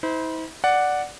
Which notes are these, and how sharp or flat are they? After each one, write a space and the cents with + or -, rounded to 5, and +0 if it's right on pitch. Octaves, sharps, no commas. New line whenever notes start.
E4 -45 C5 -25
D5 +0 F#5 +0